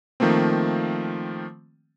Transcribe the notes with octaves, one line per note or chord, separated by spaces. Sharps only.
D#3 F3 A3 A#3 C4